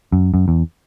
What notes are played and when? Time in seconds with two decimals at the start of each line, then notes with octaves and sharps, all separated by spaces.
0.12 F#2
0.34 F#2
0.48 E2